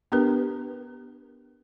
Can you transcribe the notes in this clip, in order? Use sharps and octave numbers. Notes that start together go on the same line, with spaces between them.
B3 D4 G4 A#4 B4